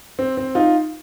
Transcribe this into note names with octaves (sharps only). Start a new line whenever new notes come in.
C4
C4
D#4 F4